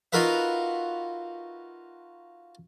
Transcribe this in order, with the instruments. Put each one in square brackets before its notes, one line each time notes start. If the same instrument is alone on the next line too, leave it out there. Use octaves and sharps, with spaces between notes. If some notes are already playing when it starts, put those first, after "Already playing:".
[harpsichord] D#4 F4 F#4 A#4 B4 E5